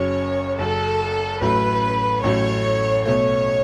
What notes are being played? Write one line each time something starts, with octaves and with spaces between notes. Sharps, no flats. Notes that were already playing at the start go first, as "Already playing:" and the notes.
Already playing: F#1 F#2 F#3 C#5
F#1 F#2 F#3 A4
A1 A2 F#3 A3 B4
A1 A2 F#3 A3 C#5
B1 B2 A3 C#5